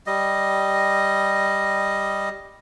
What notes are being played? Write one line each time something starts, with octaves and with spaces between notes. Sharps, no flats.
G3 D#5